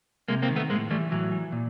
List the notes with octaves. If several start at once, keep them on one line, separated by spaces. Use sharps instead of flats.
C3 G#3 A#3
A#3 C4
D#3
A3 B3
A2 G#3 A#3
E3 G3 A3
A2 E3 F#3
E3
A#2